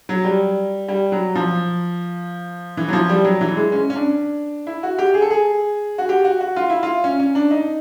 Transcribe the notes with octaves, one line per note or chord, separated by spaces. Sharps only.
F#3
G3
G3
F#3
F3
E3
F#3
F3
G3
F#3
E3
G#3
C#4
C#4
D4
E4
F#4
G4
G#4
A4
G#4
F#4
G4
F#4
F#4
F4
E4
F4
C#4
C#4
D4
D#4